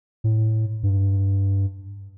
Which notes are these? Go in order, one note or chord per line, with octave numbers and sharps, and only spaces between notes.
A2
G2